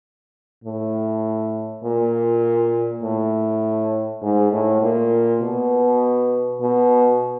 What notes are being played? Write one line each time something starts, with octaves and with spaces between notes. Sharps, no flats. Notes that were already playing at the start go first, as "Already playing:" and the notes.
A2
A#2
A2
G#2
A2
A#2
B2
B2